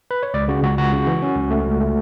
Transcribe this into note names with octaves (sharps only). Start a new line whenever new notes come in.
B4
C#5
C#2 D5
C#3 F#4
C#2 F#4
C#2 F#4
C#3
E3
C#4
C#2
A3
C#2
A3